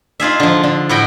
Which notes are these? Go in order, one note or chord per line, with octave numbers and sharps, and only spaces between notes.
D#4 F4 G#4 E5
D3 F3
D3
A2 E4 F#4 D#5 G5